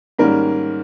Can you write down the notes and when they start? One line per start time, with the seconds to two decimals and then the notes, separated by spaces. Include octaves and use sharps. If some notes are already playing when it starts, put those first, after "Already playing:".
0.19 G#2 D#3 G3 A#3 C#4 A#4